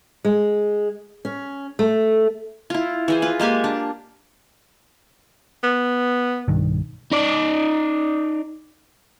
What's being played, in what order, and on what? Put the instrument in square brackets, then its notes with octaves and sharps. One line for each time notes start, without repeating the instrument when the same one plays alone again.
[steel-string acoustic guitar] G#3
C#4
A3
[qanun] E4 F4
E3 G#4 C5
F4 B4
G#3 A#3 G4 G#5
D4
[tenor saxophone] B3
[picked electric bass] B1 G2 D#3
[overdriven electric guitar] D#4 D5